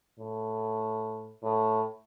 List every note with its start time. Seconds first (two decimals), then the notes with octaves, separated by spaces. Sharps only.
0.19 A2
1.43 A2